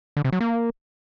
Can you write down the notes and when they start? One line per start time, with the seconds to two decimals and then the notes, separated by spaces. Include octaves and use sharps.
0.17 D3
0.25 C3
0.33 F#3
0.41 A#3